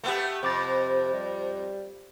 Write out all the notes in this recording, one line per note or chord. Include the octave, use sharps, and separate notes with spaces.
A3 B3 G4
F2 C3 C5 D6 A6
G3